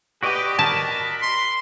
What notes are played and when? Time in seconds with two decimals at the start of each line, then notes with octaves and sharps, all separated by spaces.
0.23 F#4 G4 B4 D5 D#5
0.59 A#4 A5 B5
1.22 C6